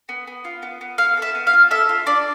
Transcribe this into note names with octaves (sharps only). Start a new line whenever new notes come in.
B3
B3
F4
B3
B3
B3 F5
A4 E5
B3
F5
F4
A4 E5
F4
D4 D5